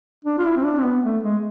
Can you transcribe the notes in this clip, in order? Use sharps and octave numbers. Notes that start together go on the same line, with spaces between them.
D4
F4
E4
C4
D4
C4
B3
A3
G#3